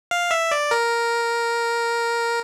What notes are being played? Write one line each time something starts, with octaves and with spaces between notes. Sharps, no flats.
F5
E5
D5
A#4